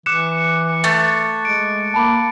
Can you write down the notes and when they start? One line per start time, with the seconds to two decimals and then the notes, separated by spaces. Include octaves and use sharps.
0.06 E3 D6 F#6 C#7 E7
0.84 A3 A6
1.45 G#3 D7
1.94 A#3 A5 B5 D6